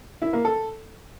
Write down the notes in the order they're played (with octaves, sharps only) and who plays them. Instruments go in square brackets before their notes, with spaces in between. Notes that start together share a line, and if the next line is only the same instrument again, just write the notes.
[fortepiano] E4
A#3
A4